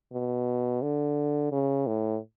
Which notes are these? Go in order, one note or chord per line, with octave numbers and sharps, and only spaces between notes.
B2
D3
C#3
A2